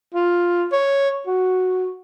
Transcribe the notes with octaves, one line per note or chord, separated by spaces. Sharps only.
F4
C#5
F#4